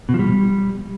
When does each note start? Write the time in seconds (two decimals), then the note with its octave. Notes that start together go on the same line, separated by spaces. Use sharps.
0.09 B2
0.14 F3
0.19 G3